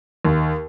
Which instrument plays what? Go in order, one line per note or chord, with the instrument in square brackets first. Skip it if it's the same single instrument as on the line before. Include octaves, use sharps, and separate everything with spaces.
[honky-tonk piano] D#2